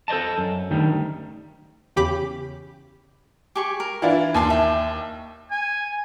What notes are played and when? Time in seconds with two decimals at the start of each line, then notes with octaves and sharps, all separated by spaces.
0.08 A4 C5 D5 D#5 A5
0.38 F#2
0.71 D2 D#3 G3
1.96 E2 C#3 G4 B5 D6 B6
3.55 G4 G#4 C#6
3.80 A#4
4.02 E3 D4 E4 F4
4.34 D#2 G#5 A5 C6
4.50 E5 G5
5.51 G#5